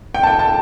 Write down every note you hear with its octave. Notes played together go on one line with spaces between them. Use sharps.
G5
A5
G5
A5